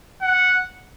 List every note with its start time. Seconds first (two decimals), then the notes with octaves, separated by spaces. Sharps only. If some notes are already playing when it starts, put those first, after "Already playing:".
0.22 F#5